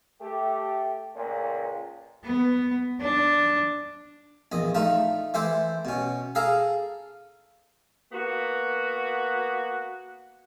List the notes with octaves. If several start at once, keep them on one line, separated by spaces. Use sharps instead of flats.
A3 G4
C#2 A#2
B3
D4
A#1 E2 D#5
A3 D#4 F4 A5
E3 E4 A4 C5 D6
B2 C#4
G#4 A4 F5 A5 A#5
A#3 B3 F#4